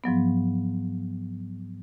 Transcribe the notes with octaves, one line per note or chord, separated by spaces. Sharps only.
G#2 F3 F#3 B3